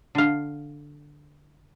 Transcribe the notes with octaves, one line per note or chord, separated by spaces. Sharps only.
D3 F5